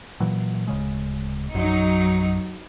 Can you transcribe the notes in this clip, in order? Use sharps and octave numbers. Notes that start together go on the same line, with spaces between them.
A#2 E3 F#3
D1 C#3 G#3
A#1 F#2 F#3 D#4